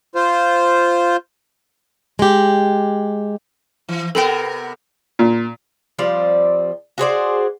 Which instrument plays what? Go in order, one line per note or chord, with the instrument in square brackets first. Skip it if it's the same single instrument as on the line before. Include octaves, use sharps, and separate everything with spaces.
[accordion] F4 C5
[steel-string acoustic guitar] G#3 G4
[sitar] E3
[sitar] C3 B3 A#4 [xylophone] A4 G5
[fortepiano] A#2
[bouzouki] F3 G3 C4 D5
F#4 G#4 C5 D5